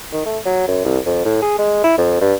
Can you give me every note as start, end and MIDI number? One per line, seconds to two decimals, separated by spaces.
0.13 0.23 51
0.26 0.38 57
0.45 0.67 54
0.68 0.84 42
0.85 0.98 36
1.06 1.23 41
1.25 1.37 45
1.42 1.57 68
1.59 1.80 56
1.84 1.94 64
1.98 2.16 41
2.21 2.34 43